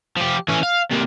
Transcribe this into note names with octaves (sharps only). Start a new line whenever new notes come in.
F3 G4
E3 C#4
F5
C3 A#3